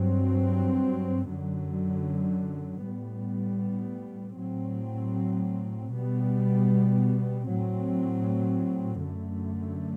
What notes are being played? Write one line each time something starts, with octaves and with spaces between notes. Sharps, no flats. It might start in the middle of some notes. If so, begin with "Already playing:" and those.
Already playing: G2 F#3 C4
F#2 D3 F#3
A2 G3 B3
A2 F#3 C4
B2 G3 B3
A2 F#3 C4
F#2 D3 A3